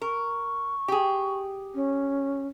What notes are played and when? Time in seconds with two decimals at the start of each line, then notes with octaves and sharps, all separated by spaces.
0.02 A#4 C#6
0.88 G4 G#4
1.75 C#4